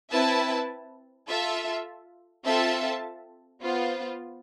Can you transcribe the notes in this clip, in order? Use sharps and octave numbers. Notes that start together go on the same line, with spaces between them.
C4 E4 B4 E5 A5
F4 A4 E5
C4 F4 A4 E5 A5
B3 F4 C5